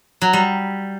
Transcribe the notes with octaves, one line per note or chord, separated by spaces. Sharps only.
F#3
G3